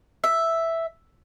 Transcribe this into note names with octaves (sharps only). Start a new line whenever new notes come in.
E5